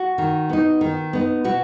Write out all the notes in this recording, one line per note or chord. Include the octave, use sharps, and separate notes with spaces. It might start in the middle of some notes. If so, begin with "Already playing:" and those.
Already playing: F#4
D#3
B3 D#4
D#3
B3 D#4
B2 F#4